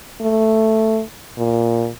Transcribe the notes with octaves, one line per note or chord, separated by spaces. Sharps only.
A3
A#2